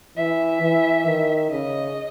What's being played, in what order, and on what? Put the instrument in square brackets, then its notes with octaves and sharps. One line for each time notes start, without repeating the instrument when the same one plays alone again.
[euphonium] E3 [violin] E5
[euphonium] E3
D#3
[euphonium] C#3 [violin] D#5